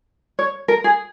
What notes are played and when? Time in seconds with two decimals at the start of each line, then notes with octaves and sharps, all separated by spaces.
0.39 C#5
0.68 A#4
0.84 G#4